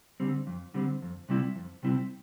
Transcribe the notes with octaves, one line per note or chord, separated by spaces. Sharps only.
D3 G3 C4
F2
D3 G3 C4
F2
C3 G3 C4 E4
F2
C3 G3 C4 E4